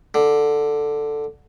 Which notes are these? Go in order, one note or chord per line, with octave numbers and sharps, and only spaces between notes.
D3